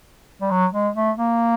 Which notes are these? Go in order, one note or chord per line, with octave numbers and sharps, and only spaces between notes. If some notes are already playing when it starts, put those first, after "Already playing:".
G3
F#3
G#3
A3
A#3